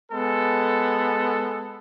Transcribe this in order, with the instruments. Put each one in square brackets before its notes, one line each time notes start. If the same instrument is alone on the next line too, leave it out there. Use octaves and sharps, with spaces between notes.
[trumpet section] G#3 B3 A4